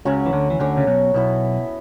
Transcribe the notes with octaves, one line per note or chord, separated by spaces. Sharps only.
C#2 C#3 F#3 C#4 F#4 C#5
E3
D2 D3
E3
D2 D3 F#3 C#4 F#4 C#5
C#3
B1 B2
B1 B2 B3 E4 A4